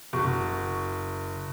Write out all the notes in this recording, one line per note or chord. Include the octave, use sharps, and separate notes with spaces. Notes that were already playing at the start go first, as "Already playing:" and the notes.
F#1 F#4 C#6